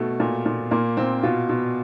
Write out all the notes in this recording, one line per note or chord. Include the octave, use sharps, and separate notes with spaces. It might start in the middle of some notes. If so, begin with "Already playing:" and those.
Already playing: B2 A3
A#2
A#2
A#2 A#3
A#2 C4
B2 F4
B2